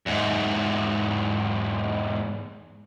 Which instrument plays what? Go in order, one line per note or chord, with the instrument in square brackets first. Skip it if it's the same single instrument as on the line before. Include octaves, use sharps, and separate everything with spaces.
[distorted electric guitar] E2 G#2